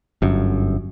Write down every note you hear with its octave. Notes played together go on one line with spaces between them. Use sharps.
G1 F#2